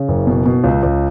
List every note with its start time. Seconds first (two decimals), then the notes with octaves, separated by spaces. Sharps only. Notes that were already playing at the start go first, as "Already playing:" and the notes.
Already playing: C#3
0.08 F#1
0.27 B2
0.46 B2
0.64 C#2
0.83 C#2